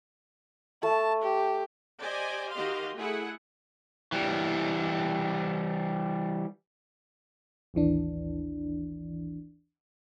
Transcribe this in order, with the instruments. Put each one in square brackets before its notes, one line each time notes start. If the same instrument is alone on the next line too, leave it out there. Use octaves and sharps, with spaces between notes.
[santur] A3 [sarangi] A5
[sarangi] G4
[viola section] G4 C5 D5 D#5 G#5
D#3 F#4 G4 D#5 F5 C6
A3 E4 G#4 F#5
[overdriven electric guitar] E3 G3
[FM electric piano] A1 D#2 E3 D4